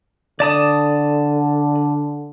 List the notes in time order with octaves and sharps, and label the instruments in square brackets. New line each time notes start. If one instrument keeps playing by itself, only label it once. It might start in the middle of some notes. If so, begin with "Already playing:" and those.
[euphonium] D3 [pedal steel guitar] D5 A5 D#6